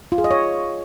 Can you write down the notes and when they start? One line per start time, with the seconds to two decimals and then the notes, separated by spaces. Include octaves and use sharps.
0.12 F4
0.18 G#4
0.24 D#5
0.31 C#5